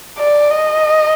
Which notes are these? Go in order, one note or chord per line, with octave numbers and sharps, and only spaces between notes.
D5
D#5